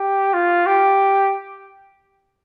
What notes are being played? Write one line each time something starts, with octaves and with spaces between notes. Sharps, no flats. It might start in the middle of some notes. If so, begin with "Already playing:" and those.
Already playing: G4
F4
G4